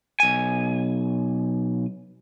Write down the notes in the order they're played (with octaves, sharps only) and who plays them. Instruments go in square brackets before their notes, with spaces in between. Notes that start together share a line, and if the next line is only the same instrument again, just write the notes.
[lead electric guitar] B1 G#5